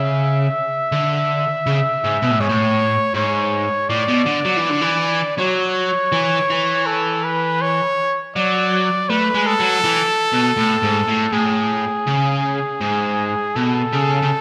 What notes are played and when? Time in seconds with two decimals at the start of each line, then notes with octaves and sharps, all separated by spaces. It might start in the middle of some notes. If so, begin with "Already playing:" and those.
Already playing: C#3 E5
0.92 D3
1.66 C#3
2.04 G#2
2.22 B2
2.31 A2
2.40 G#2 C#5
2.49 A2
3.14 G#2 C#5
3.89 A2 D5
4.08 B2
4.26 D3
4.45 F#3
4.57 E3
4.70 D3
4.81 E3
5.38 F#3 C#5
6.12 E3
6.50 E3
6.86 A4
7.24 B4
7.61 C#5
8.36 F#3 D5
9.10 A3 B4
9.34 G#3
9.46 A4
9.60 F#3
9.84 E3
10.33 B2
10.58 A2
10.83 G#2
11.08 A2
11.33 A2 G#4
12.07 C#3
12.81 G#2
13.56 B2 A4
13.93 C#3
14.22 C#3